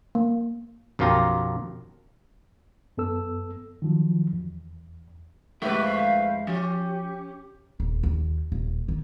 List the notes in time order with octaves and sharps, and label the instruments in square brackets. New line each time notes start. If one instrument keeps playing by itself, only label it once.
[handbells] A#3
[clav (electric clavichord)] B1 F#2 F3 F4 G4 A#5
[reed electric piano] F#2 B3 A4 E6
D#3 F3 F#3
E2
[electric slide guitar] F2 G#3 E4 [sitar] A3 B4 [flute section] G4
[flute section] C5 F5
[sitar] F3 [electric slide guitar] C#4 [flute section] G4
[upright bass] D#1
D#2
D#1
D#3